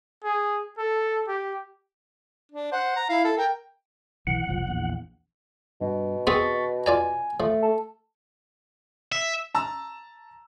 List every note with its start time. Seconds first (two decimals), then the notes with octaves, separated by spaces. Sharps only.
0.24 G#4
0.78 A4
1.28 G4
2.52 D4
2.72 C5 F#5
2.96 A#5
3.09 E4 F5
3.24 A4
3.37 A#4 G5
4.27 B1 E3 F#5
4.47 F#1 C2 F3
4.67 A#1 E2
5.81 G2 B2
6.27 B3 C4 G#4 C#6 A6 B6
6.86 F4 D5 G#5 A#5
7.40 F3 A3
7.63 A4
9.12 E5
9.55 A5 A#5 E6